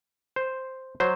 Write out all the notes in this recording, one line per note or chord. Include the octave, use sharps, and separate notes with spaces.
C5
F#3 C5